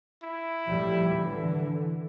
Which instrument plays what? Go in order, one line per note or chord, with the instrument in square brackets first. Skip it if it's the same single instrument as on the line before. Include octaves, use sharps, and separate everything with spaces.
[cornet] E4
[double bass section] A2 F3 G3
D3 E3